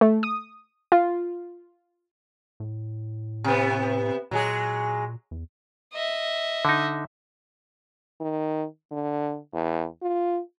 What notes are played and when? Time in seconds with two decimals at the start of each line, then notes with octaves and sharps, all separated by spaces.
0.01 A3
0.23 D#6
0.92 F4
2.60 A2
3.44 C3 B3
4.31 A#2 F#3 G#3 G#4
5.31 E2
5.94 D#5 E5
6.65 D3 D#4
8.20 D#3
8.91 D3
9.53 E2
10.02 F4